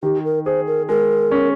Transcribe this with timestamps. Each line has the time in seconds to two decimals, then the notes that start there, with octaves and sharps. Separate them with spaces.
0.03 D#3 G4
0.25 A#4
0.46 G#4 C5
0.67 A#4
0.89 G#3 A#4
1.32 C#4